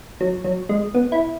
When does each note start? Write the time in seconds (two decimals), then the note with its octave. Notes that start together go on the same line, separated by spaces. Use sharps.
0.21 F#3
0.44 F#3
0.69 G#3
0.95 B3
1.12 E4